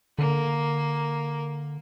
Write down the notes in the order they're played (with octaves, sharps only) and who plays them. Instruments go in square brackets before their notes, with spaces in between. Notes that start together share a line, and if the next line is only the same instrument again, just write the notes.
[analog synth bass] D3 [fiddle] A#3